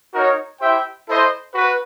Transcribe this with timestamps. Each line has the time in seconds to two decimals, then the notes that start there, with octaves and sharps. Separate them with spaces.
0.13 D#4 F#4 A#4 C#5
0.61 E4 G4 C5 E5 G5
1.07 E4 A4 C5 D#5
1.54 F#4 B4